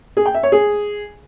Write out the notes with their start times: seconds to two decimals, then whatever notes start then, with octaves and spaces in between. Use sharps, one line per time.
0.17 G#4
0.26 G5
0.34 E5
0.43 C#5
0.52 G#4